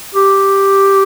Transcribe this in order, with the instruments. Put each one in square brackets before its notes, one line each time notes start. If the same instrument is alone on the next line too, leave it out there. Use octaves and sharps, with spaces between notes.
[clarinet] G4